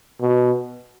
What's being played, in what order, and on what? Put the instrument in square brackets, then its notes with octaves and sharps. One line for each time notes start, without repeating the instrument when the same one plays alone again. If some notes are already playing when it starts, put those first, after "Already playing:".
[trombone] B2